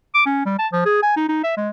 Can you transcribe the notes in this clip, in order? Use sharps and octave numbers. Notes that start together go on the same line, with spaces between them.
D6
C#4
G3
A5
F3
G#4
G#5
D#4
D#4
E5
G#3